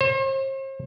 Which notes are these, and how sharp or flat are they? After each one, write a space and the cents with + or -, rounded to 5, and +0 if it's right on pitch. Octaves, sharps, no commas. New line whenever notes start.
C5 +45